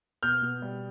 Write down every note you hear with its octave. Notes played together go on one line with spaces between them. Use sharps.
B2 F6 G6
B2
G3